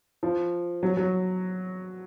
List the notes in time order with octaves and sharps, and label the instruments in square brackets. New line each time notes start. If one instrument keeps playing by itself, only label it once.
[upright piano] F3
F#3
F#3